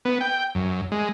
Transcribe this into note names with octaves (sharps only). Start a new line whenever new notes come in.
B3
G5
F#2
G#3